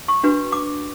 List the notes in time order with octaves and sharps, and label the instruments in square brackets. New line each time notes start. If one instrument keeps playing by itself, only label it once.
[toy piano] C#6
D4 F#4 B4
D6